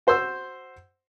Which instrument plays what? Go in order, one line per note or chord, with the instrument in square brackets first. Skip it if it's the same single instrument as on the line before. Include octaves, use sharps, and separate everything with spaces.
[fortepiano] F#4 C5 C6 E6